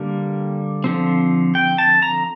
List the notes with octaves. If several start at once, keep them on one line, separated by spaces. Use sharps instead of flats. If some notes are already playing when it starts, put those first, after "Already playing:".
Already playing: D3 G3 A#3
D3 F3 C4
G5
A5
A#5